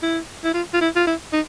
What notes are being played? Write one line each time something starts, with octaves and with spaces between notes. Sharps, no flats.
E4
E4
F4
F4
E4
F4
E4
D#4